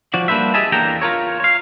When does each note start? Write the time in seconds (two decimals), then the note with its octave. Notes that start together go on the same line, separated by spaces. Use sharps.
0.14 F3 F#4 D5
0.28 G3 A#3 D4 B4 C5 E5
0.54 G4 G#4 D#5 E5 G#5 A5
0.72 E2 A#3 D4 A4 G5 A#5
1.02 F4 A#4 C#5
1.40 C#5 F5